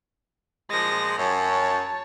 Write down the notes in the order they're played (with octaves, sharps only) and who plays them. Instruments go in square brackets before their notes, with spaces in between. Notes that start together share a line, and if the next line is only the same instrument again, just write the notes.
[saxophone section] A#2 F3 G#3 [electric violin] A#6
[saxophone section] F#2 [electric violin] C#5 A5